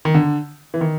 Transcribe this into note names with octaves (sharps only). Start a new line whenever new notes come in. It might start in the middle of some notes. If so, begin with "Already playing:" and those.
D#3
D3
E3
D#3